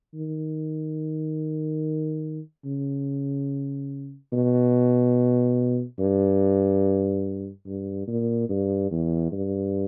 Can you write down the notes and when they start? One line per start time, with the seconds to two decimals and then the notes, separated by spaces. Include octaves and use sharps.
0.15 D#3
2.65 C#3
4.32 B2
5.99 G2
7.66 G2
8.08 A#2
8.49 G2
8.91 E2
9.32 G2